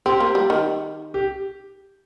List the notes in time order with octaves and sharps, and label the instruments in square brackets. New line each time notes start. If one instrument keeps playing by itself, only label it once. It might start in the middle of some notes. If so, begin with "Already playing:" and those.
[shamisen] C4 [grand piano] G4
[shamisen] A#3
G3
D#3
[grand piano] G4